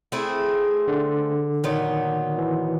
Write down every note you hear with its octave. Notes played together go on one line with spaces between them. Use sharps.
A3 C4 E4 G#4
D3
A#2 D#3 F#3 B3 D#4
E3